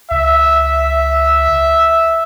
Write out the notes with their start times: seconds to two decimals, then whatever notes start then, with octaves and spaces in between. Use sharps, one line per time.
0.11 C#2 E5